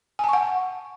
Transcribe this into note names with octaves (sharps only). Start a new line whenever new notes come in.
F#5 G#5 A5 C#6